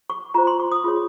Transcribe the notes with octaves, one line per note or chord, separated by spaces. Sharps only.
C#6
F4 C5 A#5
C6
C#6
D#6
F4 G#4 C#5